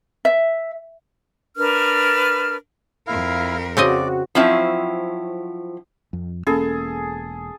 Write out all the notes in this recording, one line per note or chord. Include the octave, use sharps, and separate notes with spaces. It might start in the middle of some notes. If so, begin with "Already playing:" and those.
E5
D4 A#4 B4 F6
F2 E4 A#4 F5
C#3 C4 F#4 D5 D#5
F3 F#3 C4 C#4 E4
F2
E1 A#3 C#4 G#4 A4